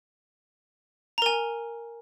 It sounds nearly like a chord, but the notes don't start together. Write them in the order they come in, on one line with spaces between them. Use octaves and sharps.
A#5 A#4 G#5